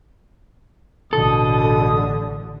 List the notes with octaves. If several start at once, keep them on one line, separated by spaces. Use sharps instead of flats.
A1 B2 D3 A4 D#6